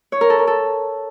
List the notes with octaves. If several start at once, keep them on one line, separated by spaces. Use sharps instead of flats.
C#5
A#4
A4
A#4
A4